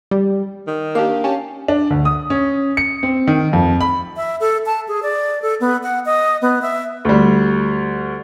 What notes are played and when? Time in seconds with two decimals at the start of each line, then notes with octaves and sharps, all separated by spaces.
0.11 G3
0.67 D#3
0.95 A#3 D4 G4 F5
1.24 C#4 G4 A5
1.68 D4
1.91 D2
2.05 D#6
2.30 C#4
2.77 C#7
3.03 C4
3.27 D#3
3.53 F2
3.81 B5
4.16 E5
4.40 A4
4.66 A5
4.88 G#4
5.03 D5
5.42 A4
5.60 B3
5.83 F#5
6.05 D#5
6.42 B3
6.62 E5
7.05 D2 G3